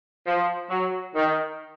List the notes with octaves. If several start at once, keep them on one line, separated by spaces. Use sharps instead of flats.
F3
F#3
D#3